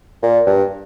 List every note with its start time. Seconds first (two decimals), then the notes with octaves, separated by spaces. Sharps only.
0.23 A#2
0.47 G2